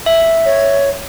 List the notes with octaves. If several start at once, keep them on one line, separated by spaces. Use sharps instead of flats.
E5
C#5